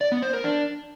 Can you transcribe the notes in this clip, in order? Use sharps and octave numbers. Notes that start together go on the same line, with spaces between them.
D5
B3
C5
A#4
D4